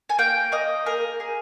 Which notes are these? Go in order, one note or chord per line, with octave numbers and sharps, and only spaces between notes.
G#5
A#3 G5
A#3 D#5
G#4 A#4
G#4